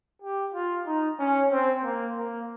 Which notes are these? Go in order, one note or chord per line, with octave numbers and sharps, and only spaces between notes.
G4
F4
D#4
C#4
C4
A#3
A#3